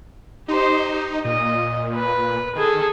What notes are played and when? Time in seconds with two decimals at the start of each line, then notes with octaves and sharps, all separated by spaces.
0.48 D#4 G4 C5
1.25 A#2 D#5
1.95 B4
2.55 D#3 G#4 A4